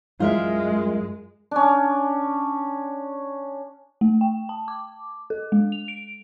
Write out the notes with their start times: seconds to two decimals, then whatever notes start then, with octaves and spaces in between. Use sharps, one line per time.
0.20 F#2 G#3 F4 A#4 E5
1.51 C#4 D4
4.01 A3
4.21 G5
4.49 A5
4.68 D6
5.30 A4
5.52 G#3
5.72 F7
5.88 D7